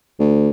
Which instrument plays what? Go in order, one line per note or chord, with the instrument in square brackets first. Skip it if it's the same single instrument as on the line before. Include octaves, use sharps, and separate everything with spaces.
[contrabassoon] D2